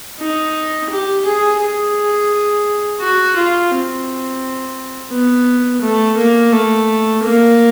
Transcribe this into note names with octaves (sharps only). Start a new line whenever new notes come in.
D#4
G4
G#4
G#4
F#4
F4
C4
B3
A3
A#3
A3
A#3